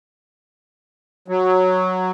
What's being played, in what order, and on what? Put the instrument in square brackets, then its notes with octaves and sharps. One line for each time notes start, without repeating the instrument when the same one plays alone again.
[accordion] F#3